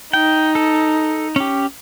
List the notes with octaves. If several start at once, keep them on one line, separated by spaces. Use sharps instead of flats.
D#4 G5
A4
C#4 G4